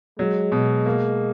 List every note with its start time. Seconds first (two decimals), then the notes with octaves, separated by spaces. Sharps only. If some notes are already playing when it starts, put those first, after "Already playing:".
0.19 F#3 G#3
0.52 B2
0.86 A#3